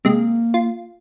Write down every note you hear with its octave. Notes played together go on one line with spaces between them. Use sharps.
C3 G#3 A#3
F4